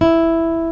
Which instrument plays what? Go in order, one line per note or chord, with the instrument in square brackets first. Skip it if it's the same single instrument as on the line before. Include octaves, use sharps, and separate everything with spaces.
[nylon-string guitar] E4